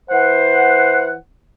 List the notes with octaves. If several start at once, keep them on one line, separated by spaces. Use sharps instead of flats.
E3 C5 F#5